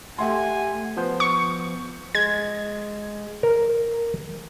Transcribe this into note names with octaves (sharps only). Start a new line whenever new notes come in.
A3 G4 E5 F#5 G#5 C6
F3 B3 C5
C#6
G#3 G#6
A#4